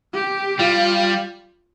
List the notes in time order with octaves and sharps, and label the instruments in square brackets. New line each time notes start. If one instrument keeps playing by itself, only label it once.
[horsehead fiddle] G4
[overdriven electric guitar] G3 [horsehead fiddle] F4